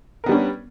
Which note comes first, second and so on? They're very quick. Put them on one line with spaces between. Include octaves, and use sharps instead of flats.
A#4 B3 G3 D4 C#4